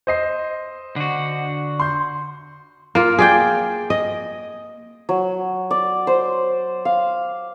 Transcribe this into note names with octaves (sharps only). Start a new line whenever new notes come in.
C5 D#5 C7
D3 F#4
C6 G6
A#3 F4
G#4 D5 G5
D#5
F#3
D5
C5
F5